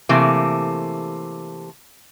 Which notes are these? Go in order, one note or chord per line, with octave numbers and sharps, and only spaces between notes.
C3 E3 A3 A#3